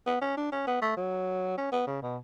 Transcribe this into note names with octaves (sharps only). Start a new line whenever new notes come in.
B3
C#4
D4
C#4
B3
A3
F#3
C#4
B3
C#3
B2